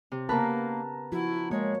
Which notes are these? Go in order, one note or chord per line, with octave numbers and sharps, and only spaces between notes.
C3
C#3 A#3 B3 A#4 B4 A5 A#5
F3 E4 F#4
G#3 A#3 C#5